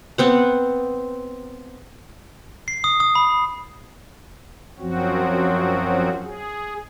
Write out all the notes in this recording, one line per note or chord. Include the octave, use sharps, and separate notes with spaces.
B3 C4 F#5
C7
D#6
D#6
B5
F#2 F3 F#3 C4 F#4
G#4